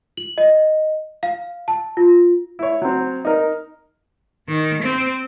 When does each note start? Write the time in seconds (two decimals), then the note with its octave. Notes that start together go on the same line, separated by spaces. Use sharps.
0.17 F#7
0.38 D#5
1.23 F5
1.68 A5
1.97 F4
2.59 E4 C#5
2.82 F#3 C4
3.25 D#4 A#4
4.48 D#3
4.83 C4